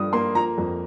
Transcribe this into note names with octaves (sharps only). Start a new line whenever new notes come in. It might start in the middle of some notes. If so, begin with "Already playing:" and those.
Already playing: G2 F3 D#6
A#3 C6
F3 A#5
F2